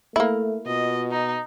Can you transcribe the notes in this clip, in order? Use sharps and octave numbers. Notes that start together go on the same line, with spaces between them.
A3 A#3 E4
B2 F4 D#5
D#4